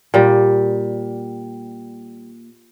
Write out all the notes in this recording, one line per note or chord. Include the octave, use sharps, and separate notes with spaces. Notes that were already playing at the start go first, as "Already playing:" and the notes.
A#2 G3